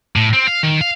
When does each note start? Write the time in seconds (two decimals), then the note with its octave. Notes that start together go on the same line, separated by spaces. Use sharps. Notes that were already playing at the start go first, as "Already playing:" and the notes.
0.16 A2
0.33 C4
0.47 F5
0.63 D#3
0.81 F5